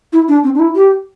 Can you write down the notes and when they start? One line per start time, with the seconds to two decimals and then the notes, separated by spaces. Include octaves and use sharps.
0.13 E4
0.28 D4
0.44 C4
0.55 D4
0.59 E4
0.75 G4